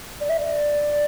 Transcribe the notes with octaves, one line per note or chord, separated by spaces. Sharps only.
D5
E5
D5